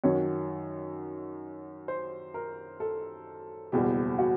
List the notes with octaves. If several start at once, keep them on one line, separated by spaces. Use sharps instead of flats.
F#2 D#3 F#3 C#5
C5
A#4
A4
F#1 E2 B2 G3 G4
F#4